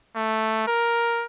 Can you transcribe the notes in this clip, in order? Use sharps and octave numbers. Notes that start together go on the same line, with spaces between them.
A3
A#4